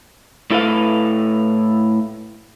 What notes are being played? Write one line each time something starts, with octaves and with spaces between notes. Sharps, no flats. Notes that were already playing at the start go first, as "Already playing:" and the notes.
A2 E4 A4 B4 F5